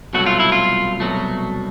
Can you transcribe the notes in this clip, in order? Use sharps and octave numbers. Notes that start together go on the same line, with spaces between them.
C2 B2 F#3 A3 F#4
F4
E4
F4
C2 B2 F#3 A3